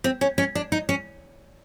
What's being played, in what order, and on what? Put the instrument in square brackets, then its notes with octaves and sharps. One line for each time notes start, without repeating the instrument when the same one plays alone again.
[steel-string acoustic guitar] C4
C#4
C#4
D4
D#4
C#4